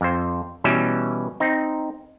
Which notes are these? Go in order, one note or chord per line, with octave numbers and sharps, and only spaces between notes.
F2 C5
B2 E3 G3 C#4 E5
C4 D#4